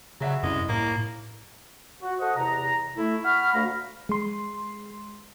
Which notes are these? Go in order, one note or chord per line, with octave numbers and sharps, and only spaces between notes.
C#3 F#3 G#4 E5 F#5
C2 F#2 G#3
A2 A#3
F#4
A4 C5 D#5 F#5
E2 C3 A#5
A3 E4
F#5 B5 C#6 F6
D2 A3 F5 A#5 B5
G#3 C6